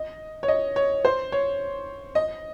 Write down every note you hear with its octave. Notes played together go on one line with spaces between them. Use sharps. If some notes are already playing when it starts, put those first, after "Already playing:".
Already playing: D#5
C#5
D#5
C#5
C5
C#5
D#5